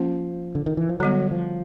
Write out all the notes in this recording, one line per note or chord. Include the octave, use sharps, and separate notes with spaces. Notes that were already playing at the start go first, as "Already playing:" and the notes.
Already playing: F3 A#3 C#4 F4
D3
D#3
E3
F3
D3 F#3 G3 B3
F3